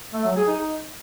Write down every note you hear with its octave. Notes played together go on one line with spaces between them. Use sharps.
A3
F#3
G#4
D#4